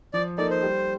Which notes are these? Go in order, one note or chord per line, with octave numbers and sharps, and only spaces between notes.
F3 D5
A#3 D#4 A4 D5
C5
G3